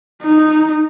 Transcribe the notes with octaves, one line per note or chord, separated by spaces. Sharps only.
D#4